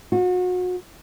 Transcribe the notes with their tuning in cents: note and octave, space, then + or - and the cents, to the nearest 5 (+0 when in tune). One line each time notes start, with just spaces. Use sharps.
F#4 -35